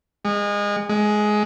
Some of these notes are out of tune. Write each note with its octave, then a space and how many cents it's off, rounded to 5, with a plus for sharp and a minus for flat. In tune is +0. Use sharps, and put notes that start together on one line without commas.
G#3 -25
G#3 +15